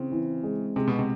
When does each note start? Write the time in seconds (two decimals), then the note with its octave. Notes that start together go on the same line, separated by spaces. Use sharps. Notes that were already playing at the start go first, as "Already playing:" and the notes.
Already playing: C#3 E3 C4
0.12 E3
0.43 G#3
0.76 C3 G#3
0.87 B2
0.99 C3